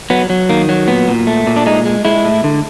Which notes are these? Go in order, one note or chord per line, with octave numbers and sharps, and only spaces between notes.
F#3 B3
F#3
D#3 A#3
F#3
A#2 B3
A#2
A3
A#2
D4
G#3 D#4
G#3
G#3 E4
A2
D3